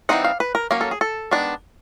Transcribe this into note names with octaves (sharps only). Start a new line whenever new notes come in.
E3 G3 C4 D#4 F#5
F5
B4
A#4
F#3 A#3 C#4 A#4
A4
G#4
A4
D#3 G#3 B3 D4